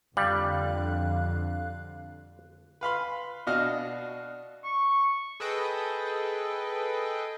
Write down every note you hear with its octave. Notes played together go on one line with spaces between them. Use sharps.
F2 D3 G3 F5 F#6
B4 F5 B5 C6
B2 D4 F#4 D#5 F5 F6
C#6
G#4 A4 B4 D#5 G5